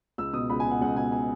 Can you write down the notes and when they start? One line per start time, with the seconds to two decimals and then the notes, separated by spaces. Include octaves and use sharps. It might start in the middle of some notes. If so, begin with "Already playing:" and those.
0.18 C#2 E6
0.34 B2 D#6
0.50 C#2 B5
0.60 G#5
0.66 B2
0.71 F#5
0.81 C#2 F#5
0.97 B2 G#5
1.12 G#5